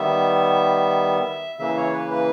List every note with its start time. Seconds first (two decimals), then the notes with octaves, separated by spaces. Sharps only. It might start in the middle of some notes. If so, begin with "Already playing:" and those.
Already playing: D#3 G3 B3 E5
1.59 C#3 E3 A#3 E5
1.77 C#5
1.93 B4
2.11 B4